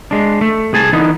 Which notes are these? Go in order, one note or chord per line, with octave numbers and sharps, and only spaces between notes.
G#3 D4
A3
C2 G#4 G#5 A5
D3 E3 B3 D#4